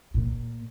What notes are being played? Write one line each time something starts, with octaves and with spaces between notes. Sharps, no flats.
A#2